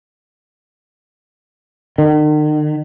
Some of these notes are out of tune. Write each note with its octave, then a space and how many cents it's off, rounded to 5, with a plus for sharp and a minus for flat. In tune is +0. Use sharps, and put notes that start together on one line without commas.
D#3 -45